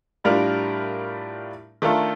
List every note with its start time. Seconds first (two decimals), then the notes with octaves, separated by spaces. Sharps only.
0.24 A2 G3 D4 F4 A#4
1.82 D#3 A3 D4 F4 A4